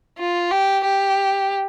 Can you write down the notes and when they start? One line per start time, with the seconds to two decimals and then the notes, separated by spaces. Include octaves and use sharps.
0.19 F4
0.51 G4
0.84 G4